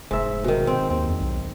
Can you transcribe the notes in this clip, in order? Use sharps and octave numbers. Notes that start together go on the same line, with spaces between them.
F1 G#2 E5
B2 D#3
C4
D#2 C4
E2
B1